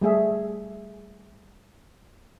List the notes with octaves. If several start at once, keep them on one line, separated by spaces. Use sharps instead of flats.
G3 A3 G#4 E5